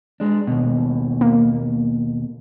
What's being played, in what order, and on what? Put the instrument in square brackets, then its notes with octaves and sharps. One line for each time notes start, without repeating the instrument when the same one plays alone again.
[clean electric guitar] G#3 D4
D#2 B2
[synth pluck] A#3